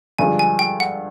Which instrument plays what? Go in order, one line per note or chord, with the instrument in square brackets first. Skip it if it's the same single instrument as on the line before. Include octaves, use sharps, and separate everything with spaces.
[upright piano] G2 D3 F3 G#3 [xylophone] G#5
[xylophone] G#5
G5
F#5